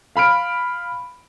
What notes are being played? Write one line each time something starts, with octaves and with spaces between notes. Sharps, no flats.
F5 B5 F6 D7